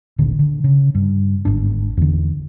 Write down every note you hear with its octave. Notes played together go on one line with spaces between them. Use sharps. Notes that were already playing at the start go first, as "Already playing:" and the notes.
D1 G#1 A#2 D3
D3
C#3
G2
G1 G#2 D4
E2 D3